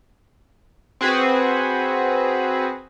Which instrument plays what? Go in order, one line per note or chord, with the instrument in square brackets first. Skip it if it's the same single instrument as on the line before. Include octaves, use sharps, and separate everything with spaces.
[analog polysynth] C4 F#4 G#4 B4